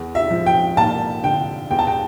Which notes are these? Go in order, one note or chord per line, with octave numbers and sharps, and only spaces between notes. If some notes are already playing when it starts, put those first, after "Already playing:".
Already playing: E2
E5
F3
G5
A#3 A5
D3 G5
E2 G5
A5
G5